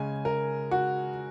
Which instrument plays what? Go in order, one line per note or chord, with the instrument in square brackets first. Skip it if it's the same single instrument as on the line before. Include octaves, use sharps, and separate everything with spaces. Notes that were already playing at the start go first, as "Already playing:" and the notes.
Already playing: [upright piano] C#3 G#3 C#4 G#5
A#4
F#4